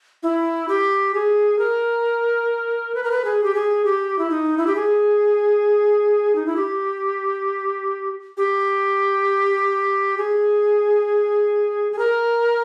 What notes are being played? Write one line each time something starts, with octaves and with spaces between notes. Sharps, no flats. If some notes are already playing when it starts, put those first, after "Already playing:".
E4
G4
G#4
A#4
B4
A#4
B4
G#4
G4
G#4
G4
E4
D#4
E4
G4
G#4
D#4
E4
G4
G4
G#4
G#4
A#4